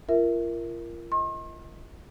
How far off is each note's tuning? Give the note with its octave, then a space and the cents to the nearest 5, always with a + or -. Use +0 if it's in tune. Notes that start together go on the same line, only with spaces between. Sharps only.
F4 -35 A#4 +0 E5 +0
D#5 +30 C6 +45